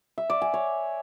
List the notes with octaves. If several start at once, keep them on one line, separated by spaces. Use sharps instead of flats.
E5
D5
G#5
C#5